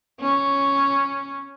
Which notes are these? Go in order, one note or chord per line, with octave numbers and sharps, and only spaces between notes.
C#4